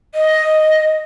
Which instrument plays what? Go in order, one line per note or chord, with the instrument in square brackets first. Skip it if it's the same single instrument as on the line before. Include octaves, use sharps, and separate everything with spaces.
[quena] D#5